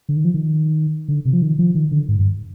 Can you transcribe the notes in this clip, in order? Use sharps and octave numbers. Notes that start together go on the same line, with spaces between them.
D3
D#3
F3
D#3
D3
C3
F3
D#3
F3
D#3
D3
G#2
G2